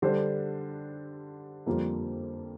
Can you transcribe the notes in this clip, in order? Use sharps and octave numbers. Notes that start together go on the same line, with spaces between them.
D3 G3 D4 A4 C5
F2 D3 G3 A#3 F4